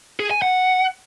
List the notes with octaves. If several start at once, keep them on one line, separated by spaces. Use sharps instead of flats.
G#4
G#5
F#5